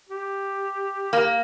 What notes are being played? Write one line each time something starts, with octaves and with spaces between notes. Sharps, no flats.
G4
A#3